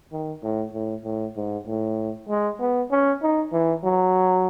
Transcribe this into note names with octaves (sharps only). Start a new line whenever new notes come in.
D#3
A2
A2
A2
G#2
A2
G#3
B3
C#4
D#4
E3
F#3